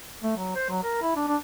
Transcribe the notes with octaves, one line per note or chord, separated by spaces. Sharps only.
A3
F#3
C5
F#3
A#4
E4
D4
D4